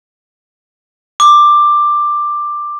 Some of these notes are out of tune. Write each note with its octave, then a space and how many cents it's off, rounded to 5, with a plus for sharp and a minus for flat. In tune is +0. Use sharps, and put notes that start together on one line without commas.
D6 +10